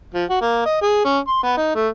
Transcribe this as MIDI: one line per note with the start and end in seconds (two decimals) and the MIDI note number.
0.14 0.25 53
0.30 0.39 66
0.42 0.61 58
0.66 0.81 75
0.82 1.05 68
1.05 1.19 61
1.28 1.43 84
1.43 1.55 59
1.57 1.71 63
1.75 1.88 57